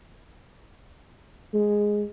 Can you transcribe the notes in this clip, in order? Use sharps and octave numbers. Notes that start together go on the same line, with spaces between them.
G#3